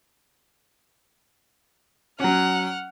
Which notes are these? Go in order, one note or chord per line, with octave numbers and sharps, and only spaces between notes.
F#3 C#4 F#5 F6